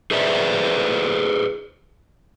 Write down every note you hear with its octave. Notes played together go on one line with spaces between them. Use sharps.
G#4 B4 C5 D5 E5